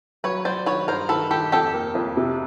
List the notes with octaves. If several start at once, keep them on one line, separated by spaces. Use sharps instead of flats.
F#3 B4 C#5
F#3 C5 D5
D#3 B4 C#5
G2 A#4 C5
D#3 A4 B4
D#3 G4 A4
F2 G4 A4
A#3
F2
C3